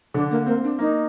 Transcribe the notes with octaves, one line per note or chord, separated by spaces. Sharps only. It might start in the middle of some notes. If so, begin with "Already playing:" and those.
D3 D4
A#3
A#3 C4
D4
A#3 D#4